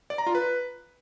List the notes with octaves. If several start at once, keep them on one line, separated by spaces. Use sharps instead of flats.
D5
A#5
F4
B4